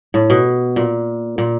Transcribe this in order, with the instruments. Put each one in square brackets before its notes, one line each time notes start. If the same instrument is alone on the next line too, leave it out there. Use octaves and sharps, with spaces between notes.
[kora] A2
B2
A#2
A#2